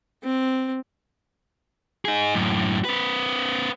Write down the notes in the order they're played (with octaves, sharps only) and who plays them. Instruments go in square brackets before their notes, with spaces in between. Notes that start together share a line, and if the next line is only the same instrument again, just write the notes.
[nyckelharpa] C4
[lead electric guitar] D#4 G#4
F#2 A2
C4 B4